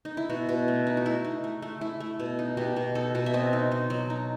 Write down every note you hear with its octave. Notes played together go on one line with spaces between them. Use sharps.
D#4
E4
B2 F#4
B2
A3
D#4
F#4
A3 E4
D#4
A3
A3
A3 E4
A3
B2
D#4
B2 G4
B2
D#4 A4
B2
E5
C4 D#5
D#4
D#4
F#3
D#4